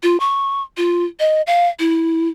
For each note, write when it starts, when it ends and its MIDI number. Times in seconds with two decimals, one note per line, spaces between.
0.03 0.19 65
0.20 0.62 85
0.77 1.04 65
1.20 1.42 75
1.47 1.68 77
1.79 2.28 64